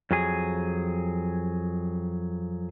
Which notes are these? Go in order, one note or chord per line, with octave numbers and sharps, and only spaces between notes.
F2 F#3 G#4